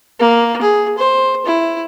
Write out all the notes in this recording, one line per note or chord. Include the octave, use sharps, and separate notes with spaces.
A#3
G#4
C5
E4